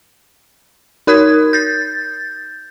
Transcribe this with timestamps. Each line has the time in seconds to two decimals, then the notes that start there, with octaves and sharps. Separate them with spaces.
1.07 D#4 A#4 D#6 G#6
1.53 G6 A6